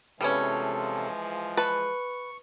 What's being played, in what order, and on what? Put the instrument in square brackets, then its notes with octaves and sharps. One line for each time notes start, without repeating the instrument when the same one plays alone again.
[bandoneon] C3 A4 [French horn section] E3 F3 G#3 [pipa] G3 B3 C#4
[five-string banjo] B4 [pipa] A5 [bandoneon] C#6